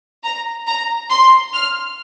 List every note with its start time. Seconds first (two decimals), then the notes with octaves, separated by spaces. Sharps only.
0.23 A#5
0.67 A#5
1.09 C6
1.53 F6